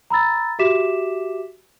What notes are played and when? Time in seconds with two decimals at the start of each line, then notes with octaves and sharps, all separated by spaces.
0.10 A#5 B5 E6 A6
0.59 F#4 G4 E5 D6 B6 E7